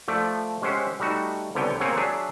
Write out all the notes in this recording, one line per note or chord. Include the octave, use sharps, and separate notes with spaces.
F3 A3 D5
G#3 C#4 G4 C5 E5 F#5
G3 A3 D#4 F#4
C2 D3 B3 C#5 G5 G#5
A#3 C4 G#4 C#5 F#5
F#3 D4 G#4 E5